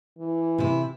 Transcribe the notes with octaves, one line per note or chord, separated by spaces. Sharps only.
E3
C3 E4